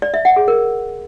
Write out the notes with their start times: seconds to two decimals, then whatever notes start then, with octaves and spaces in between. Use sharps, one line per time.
0.02 D5
0.14 E5
0.25 F#5
0.36 G#4
0.48 A#4